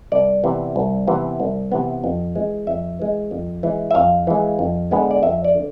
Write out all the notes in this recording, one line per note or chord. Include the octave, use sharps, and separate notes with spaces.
C2 D5
C3 E3 B3
C2
C3 E3 B3
C2
C3 E3 B3
F2
E3 G#3
F2 E5
E3 G#3
F2
E3 G#3
E5
F2 F5
E3 G#3
F2
D3 G#3 B3
D5
F2 E5
D5
D3